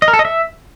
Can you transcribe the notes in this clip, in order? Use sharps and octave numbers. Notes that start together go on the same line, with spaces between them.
D#5
A#4
A4
D#5
E5